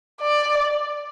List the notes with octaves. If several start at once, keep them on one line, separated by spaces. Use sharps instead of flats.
D5